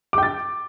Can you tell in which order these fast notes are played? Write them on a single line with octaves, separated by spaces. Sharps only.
D6 G5 A6